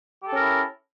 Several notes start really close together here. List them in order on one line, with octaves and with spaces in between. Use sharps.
G4 A4 C#4 A#4 E4